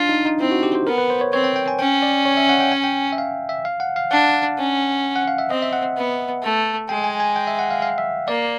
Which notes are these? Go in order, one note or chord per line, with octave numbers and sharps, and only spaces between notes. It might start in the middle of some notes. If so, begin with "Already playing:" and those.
Already playing: D4 F4
D#4
D#4
C4 E4
F#4
G4
C5
B3 A#4
B4
C5
C#5
C4 C#5
G5
G5
G#5
C#4 G5
D5
C#5
E5
F#5
G5
G#5
G5
E5
F5
E5
F5
F#5
F5
D4 F#5
C#4
F#5
F5
E5
C4 D#5
E5
F#5
B3
A3
G#3 G5
G#5
G#5
G5
E5
F#5
F5
F5
E5
A#3 D5